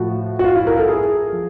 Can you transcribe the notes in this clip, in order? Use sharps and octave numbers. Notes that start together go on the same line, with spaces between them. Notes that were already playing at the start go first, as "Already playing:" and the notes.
Already playing: A2 F3 F#4
F#4
F4
E4
A#4
A4
G#4
F3